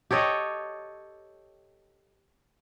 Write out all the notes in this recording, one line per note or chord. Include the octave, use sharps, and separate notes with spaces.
G4 A4 C#5 D#5